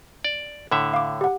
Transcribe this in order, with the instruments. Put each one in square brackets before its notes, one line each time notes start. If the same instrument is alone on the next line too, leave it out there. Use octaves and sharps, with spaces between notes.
[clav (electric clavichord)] D5
A2 D3 E5
[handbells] F5 D6
G4 F#5